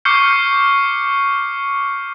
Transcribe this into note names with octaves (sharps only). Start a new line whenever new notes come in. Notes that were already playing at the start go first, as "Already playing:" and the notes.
C#6 D6 F6 G6 C7 C#7